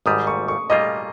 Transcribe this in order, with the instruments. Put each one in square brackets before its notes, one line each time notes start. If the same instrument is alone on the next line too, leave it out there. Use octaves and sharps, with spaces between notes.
[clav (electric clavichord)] G#1 G#2 D#3 G3 [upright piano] D#6
[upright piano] C#6
C#6
[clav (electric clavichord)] A#2 G3 A#3 F4 [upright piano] D#5